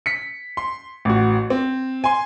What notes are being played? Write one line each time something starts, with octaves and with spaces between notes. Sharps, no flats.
B6 C#7
C6
A1 F#4
C4
G#5 C6